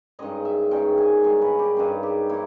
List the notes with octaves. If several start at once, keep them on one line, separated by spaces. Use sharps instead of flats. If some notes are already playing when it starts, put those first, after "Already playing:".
G2 D#3 G#3 C#4 D#5
E5
G2 D#3 G#3 C#4 G5
G#5
G2 D#3 G#3 C#4 G#5
B4
G4
G2 D#3 G#3 C#4 G#4
G4
D#3 A#3 D#4 E4